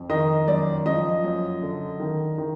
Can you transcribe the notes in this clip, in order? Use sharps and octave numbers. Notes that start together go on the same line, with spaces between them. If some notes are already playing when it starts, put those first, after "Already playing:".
Already playing: F2
D#3 D#5
F#2 D5
F3 D#5
F#2
D3
D#3
D#3